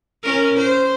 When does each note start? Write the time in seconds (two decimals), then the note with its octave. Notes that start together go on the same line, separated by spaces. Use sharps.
0.24 C#4 A#4
0.58 C5